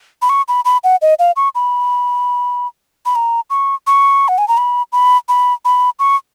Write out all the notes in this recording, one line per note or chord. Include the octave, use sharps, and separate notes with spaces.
B5
C#6
B5
B5
F#5
D#5
F5
C#6
B5
B5
A#5
C#6
C#6
F#5
G#5
A#5
B5
B5
B5
B5
C#6